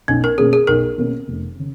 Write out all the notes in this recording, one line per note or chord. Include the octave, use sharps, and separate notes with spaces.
B1 C#4
A#4
B2 A#3 C#4 G#4
G#4
B1 A#4
B2 A#3 C#4
F1
C#3